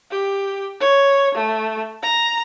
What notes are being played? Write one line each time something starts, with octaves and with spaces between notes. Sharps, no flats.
G4
C#5
A3
A#5